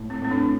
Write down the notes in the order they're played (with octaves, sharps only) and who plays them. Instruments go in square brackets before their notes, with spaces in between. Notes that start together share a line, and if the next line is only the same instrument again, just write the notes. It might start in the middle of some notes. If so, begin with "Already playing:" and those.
Already playing: [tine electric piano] A2
[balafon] C4
[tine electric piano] A2 [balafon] C4
[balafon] D4